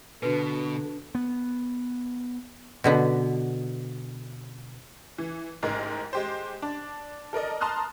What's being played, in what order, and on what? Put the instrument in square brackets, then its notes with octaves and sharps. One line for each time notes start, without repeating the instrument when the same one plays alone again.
[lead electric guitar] B2 [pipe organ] D3 [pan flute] D4 [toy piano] F#4 B4
[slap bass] B3
[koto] B2 D3 B3
[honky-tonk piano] E3
A1 G#2 G#3 A#4
G#3 G4 C5
D4
A4 A#4 D5 D#5
A5 A#5 C6 D#6 F6 F#6